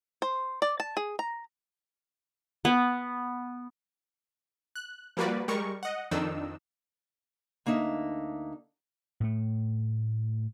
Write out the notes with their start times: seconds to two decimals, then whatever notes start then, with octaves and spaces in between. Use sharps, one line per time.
0.22 C5
0.62 D5
0.80 A5
0.97 G#4
1.19 A#5
2.65 B3
4.76 F#6
5.17 F3 G3 A#3 F#4 B4 D5
5.48 G3 G#3 A#4 C#6
5.83 D#5 F#5
6.11 F2 D#3 D4 D#4 E6
7.66 D2 A#3 D4 D#4 E5
9.20 A2 A3